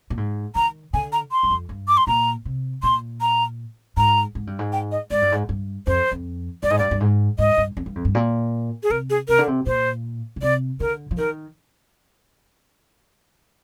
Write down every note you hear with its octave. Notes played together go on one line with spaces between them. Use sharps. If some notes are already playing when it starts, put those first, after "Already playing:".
A#2
G#2
D#3 A#5
D3 G#5
A#5
C6
G2
F2
G2
D6
C6
A#2 A#5
C3
A#2 C6
A#5
G#2 A#5
G#2
G2
G#2
G5
D#5
G#2 D5
G2
G#2
G2
F2 C5
F2
G2 D5
G#2 D#5
G2 D5
G2
G#2
G#2 D#5
G2
F2
G2
F2
G2
A#2
G#4
C3 A#4
G#4
C3 A#4
D3
C3
A#2 C5
D3
C3 D5
D3 A#4
F3
D#3 A#4